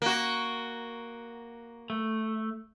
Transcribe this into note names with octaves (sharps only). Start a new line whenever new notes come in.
A#3 F#4
A3